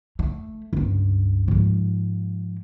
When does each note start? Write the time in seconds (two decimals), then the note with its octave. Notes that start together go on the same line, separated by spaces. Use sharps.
0.19 A3
0.73 C#2 G2
1.48 G#2 F3